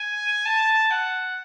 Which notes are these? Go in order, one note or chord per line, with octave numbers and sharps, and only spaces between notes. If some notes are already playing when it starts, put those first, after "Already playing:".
Already playing: G#5
A5
F#5